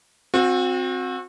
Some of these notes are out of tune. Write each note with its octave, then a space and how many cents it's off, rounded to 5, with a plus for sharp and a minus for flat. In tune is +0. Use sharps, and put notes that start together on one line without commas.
C4 +10 F#4 -35